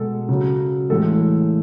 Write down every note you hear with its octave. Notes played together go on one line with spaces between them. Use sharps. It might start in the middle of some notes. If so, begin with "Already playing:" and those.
Already playing: B2 G#3 A4
C#3 F#3
A2 E3 G#3 A4